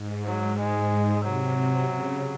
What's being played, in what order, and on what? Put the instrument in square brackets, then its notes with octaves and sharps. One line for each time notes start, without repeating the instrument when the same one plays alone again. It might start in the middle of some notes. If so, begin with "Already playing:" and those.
Already playing: [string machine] G#2
[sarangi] F#3
G#3
[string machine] C3 [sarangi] F#3
[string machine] C3
C#3